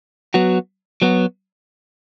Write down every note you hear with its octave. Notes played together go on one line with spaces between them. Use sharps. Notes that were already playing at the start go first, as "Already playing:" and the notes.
F#3 B3 F#4
F#3 B3 F#4